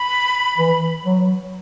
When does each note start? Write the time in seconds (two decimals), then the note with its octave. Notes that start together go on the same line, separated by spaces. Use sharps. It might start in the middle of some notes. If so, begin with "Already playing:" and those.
Already playing: B5
0.58 E3
1.05 F#3